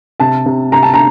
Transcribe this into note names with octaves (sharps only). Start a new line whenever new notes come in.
C3 A5
C3
C3 A#5
A5
A#5